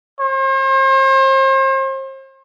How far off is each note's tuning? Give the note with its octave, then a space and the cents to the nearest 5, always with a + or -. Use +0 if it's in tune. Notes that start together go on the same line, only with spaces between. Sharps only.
C5 +40